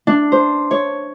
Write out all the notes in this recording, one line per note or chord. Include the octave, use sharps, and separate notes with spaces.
D4
C5
C#5